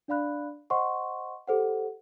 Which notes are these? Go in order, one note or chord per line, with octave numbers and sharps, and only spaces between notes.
D4 D5 F5 B5 F#6
C5 D#5 F#5 C6 C#6
G4 A4 C5 F#5